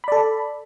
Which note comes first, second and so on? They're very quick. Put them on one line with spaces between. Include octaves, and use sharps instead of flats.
B5 D5 A4